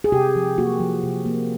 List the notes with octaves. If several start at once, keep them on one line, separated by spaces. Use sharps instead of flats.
G#4
C3 G4
F3
A#3 F#4
F3
C3
A#3